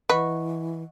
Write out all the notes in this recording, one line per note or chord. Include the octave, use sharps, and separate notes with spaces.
E3 B4 D#5 F#5 C#6